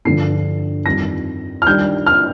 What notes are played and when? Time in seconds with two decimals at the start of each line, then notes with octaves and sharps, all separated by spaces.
0.05 G2 D3 F3 C7
0.86 F2 D#3 G3 A#6
1.62 F6
1.66 D#3 G3 D4 G6
2.06 F6